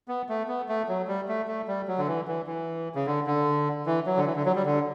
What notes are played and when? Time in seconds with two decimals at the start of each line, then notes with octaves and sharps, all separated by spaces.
0.08 B3
0.29 A3
0.48 B3
0.69 A3
0.88 F#3
1.07 G3
1.28 A3
1.48 A3
1.68 G3
1.88 F#3
1.98 D3
2.07 E3
2.28 E3
2.47 E3
2.95 C#3
3.06 D3
3.27 D3
3.86 E3
4.06 F#3
4.17 D3
4.26 E3
4.36 D3
4.45 F#3
4.55 G3
4.66 D3